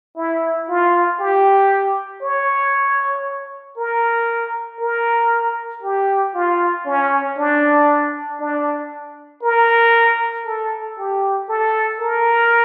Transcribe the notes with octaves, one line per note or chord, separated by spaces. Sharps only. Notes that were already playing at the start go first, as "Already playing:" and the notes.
E4
F4
G4
C#5
A#4
A#4
G4
F4
C#4
D4
D4
A#4
A4
G4
A4
A#4